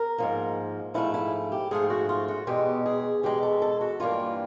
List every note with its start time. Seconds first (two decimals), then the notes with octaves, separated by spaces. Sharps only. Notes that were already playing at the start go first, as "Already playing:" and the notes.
Already playing: A#4
0.18 G#2 F3 A#3
0.94 G#2 F3 A3 E4
1.14 E4
1.52 G4
1.71 G#2 F3 A3 G#4
1.90 F#4
2.09 F4
2.28 F#4
2.47 E2 B2 G#3 G4
2.86 G#4
3.23 E2 B2 G#3 G4
3.43 A4
3.62 A4
3.81 F#4
4.00 G2 E3 G3 A#3 F4